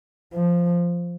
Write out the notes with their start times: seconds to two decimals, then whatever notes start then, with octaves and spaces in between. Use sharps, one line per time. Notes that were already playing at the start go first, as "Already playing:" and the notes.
0.34 F3